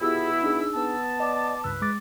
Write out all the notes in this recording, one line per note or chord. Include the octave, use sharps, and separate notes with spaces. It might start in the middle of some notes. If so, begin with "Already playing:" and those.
B2 B3 E4 F4 G4 G#4 E6
D4 D#4 G#4
B3 A5
D5 D#5 D6
C#2 G2 B4 E6
G#3 D6 A6